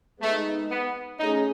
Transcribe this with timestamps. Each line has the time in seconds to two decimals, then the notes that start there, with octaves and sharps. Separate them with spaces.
0.21 G#3 A3 B3 D#4
0.70 B3
1.19 A3 C#4 D#4 G#4